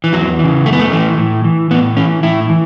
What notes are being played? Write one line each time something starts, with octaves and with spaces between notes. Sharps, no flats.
E3
E2 F#3
C#3 E3
F#2 A3
B3
A3
E3
A2
E3
A2 B3
E3 C#4
A2 E4
E3